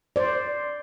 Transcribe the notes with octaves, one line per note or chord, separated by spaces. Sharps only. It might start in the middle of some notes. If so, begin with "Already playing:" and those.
C5 D5